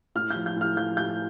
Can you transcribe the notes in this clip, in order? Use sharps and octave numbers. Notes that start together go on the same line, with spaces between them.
A2 F6
G6
F3
G6
A2 F6
F3 G6
A2 G6